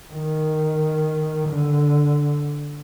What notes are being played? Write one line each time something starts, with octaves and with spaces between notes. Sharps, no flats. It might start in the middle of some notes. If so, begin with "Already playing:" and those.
D#3
D3